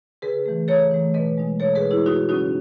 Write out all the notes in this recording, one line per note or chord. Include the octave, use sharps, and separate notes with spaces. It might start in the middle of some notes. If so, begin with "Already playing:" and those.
C#3 G#4 B4
E3 A3
C#3 A4 C#5
E3 A3
B2 B4 D#5
G#3 D#4
B2 A4 C#5
G#4 B4
G#3 D#4
E4 G#4
F#2 D#4 F#4
C#3 F#3 C#4 D#4 F#4